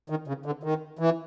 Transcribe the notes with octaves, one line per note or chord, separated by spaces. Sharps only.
D#3
C#3
D3
D#3
E3